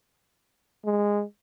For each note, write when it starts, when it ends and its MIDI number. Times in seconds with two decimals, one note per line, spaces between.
0.85 1.23 56